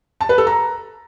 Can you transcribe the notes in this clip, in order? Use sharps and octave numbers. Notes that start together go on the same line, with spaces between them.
A5
B4
A4
A#5